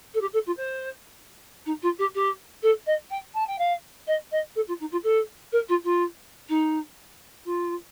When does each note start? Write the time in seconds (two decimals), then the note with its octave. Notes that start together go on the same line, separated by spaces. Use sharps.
0.14 A4
0.21 G4
0.33 A4
0.46 F4
0.57 C5
1.65 D#4
1.82 F4
1.98 G4
2.15 G4
2.62 A4
2.86 D#5
3.10 G5
3.34 A5
3.47 G5
3.58 F5
4.07 D#5
4.31 D#5
4.55 A4
4.67 F4
4.80 D#4
4.91 F4
5.03 A4
5.52 A#4
5.68 F4
5.83 F4
6.48 D#4
7.45 F4